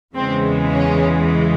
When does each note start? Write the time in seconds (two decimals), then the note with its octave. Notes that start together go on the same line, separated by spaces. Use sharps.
0.15 E2 C#3 E3 G#3 C4
0.71 C#4